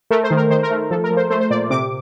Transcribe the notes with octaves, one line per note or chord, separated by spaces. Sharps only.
A3 A#4
C5
D#3
A#4
D#3 C5
A#4
A3
F3 A4
A#4
F3
C5
A3 C5
C5
A#2 D5
C3 D6